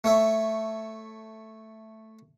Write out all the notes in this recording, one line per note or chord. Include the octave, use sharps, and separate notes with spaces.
A3 C#5 E5